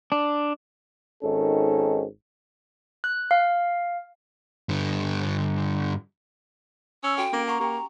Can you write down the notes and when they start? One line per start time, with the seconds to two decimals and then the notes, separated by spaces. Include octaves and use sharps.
0.12 D4
1.23 G#1 G#2 D#3 C#4 A4
3.04 F#6
3.31 F5
4.69 G2 D3
7.04 C#4 E6
7.17 F#4 A4 F5 G5
7.33 A#3 C#4 A#5 D6
7.47 F5 F#5 A#5 C#6
7.60 A#3 G4 G5